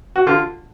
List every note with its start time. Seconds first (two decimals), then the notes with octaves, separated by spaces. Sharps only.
0.16 F#4
0.27 D3 F4